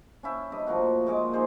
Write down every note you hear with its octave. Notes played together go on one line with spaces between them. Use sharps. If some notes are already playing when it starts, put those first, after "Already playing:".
C#4 E4 E5 G5
G2 D#5 D6
A2 F3 A#3 F#4
A#2 G#3 D#5 D6
D#4 G#4 C5 D5